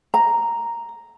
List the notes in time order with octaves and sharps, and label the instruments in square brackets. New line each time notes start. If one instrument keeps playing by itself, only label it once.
[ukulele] A#5